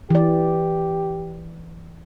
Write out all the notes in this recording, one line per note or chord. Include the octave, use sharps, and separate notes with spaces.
E3 G4 D5